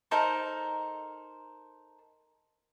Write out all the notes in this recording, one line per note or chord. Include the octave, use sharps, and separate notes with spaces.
D#4 A4 A#4 C5